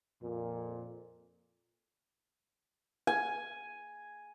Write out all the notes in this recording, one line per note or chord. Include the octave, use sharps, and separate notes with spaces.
F2 A#2
G#5